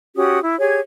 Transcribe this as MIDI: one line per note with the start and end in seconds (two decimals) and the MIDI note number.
0.16 0.38 61
0.16 0.38 66
0.16 0.38 67
0.16 0.38 87
0.42 0.59 64
0.59 0.79 67
0.59 0.79 68
0.59 0.79 73
0.59 0.79 92